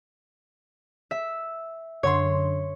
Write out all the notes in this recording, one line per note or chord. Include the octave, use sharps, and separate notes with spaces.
E5
F#2 D3 C#5 C6